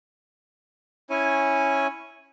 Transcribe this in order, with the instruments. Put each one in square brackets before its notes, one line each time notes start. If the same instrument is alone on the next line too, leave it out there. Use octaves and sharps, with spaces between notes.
[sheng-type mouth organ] C#4 E4 C#5 G#5